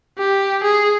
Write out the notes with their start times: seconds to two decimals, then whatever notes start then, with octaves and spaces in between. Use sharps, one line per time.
0.18 G4
0.63 G#4